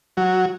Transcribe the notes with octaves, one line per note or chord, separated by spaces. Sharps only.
F#3